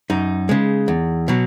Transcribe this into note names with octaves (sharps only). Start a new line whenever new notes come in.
F#2 D#4
C#3 G#3
E2
B2 F#3